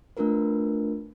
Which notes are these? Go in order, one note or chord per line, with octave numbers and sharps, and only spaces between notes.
A3 D4 F4 A#4 B4